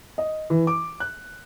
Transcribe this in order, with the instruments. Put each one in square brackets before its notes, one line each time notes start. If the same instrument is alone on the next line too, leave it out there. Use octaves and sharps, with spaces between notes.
[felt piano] D#5
E3
D6
F#6